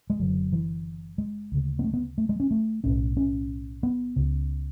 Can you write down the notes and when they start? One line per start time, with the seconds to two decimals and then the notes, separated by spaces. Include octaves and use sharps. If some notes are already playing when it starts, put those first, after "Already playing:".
0.10 G#3
0.19 F#1 F#2 D3 F#3
0.52 E3
1.18 G#3
1.52 D2 C#3
1.79 B3
1.84 A3
1.94 B3
2.18 A3
2.29 G#3
2.40 C#4
2.51 A3
2.84 B1 A2 C#4
3.17 C#4
3.83 B3
4.16 C#2 C#3